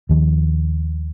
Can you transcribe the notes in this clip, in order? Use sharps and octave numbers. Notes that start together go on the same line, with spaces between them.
D#2 D#3 F3